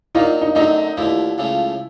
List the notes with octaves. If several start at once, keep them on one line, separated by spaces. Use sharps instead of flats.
A#2 F#3 A#3 D#4 F4
D#4
F#2 D3 F#3 A3 C4 D#4
D#2 D3 F3 A3 E4
C#2 C#3 F3 A3